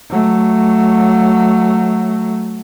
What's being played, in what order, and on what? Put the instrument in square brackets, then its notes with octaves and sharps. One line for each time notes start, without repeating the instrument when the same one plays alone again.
[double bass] F#3 A3